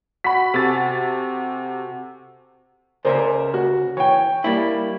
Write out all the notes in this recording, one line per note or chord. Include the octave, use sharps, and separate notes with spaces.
F#4 B5 B6
C3 F#4 A4 G#5 A6
C#2 C#3 A#4 C5 D5 E5
F#4
E3 C#5 G5
G3 A#3 E4